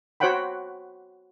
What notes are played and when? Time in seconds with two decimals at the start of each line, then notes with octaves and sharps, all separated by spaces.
0.20 F#4 C5 C#5 F#5 G5 B5